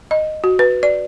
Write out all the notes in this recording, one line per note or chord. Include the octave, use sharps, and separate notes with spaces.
D#5
F#4
B4
D5